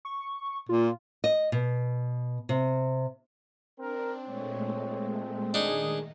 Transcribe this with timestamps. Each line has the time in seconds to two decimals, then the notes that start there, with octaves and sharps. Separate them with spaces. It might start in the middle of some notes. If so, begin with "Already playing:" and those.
0.05 C#6
0.69 A#2 F4
1.24 D#5
1.52 B2
2.49 C3
3.80 C4 D4 A#4
4.25 A#2 G#3 A3 C#5
5.54 D#3 D4 D#4 G#4